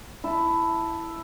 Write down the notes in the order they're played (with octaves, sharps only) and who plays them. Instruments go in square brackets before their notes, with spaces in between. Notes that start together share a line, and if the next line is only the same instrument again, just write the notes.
[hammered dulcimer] E4 A5